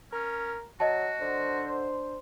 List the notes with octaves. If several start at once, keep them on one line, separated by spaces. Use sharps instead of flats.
C#4 A#4
F#3 F#4 D#5 A5
D3 D4 C5